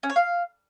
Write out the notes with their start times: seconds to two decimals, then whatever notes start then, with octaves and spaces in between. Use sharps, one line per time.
0.03 C#4
0.10 C#5
0.16 F5